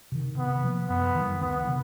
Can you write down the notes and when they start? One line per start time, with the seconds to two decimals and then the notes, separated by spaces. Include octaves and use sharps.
0.12 C3 D#3
0.38 C3 B3
0.64 F3 A#3
0.89 F#2 B3
1.15 D#3 G3
1.41 D2 B3
1.67 C3 D#3